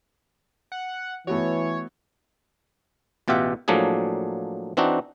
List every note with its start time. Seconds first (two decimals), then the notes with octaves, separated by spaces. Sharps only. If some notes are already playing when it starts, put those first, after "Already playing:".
0.72 F#5
1.27 E3 A3 B3 F#4 C#5
3.28 A1 B2 F4 G4 E5 F#5
3.68 A2 F3 F#3 A#3 D4 G#4
4.77 E3 C4 D4 D#4 F#4